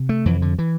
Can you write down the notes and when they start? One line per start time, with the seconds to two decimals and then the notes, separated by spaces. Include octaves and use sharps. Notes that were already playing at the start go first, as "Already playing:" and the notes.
Already playing: C3
0.09 A3
0.25 F2 E3
0.42 D3
0.59 E3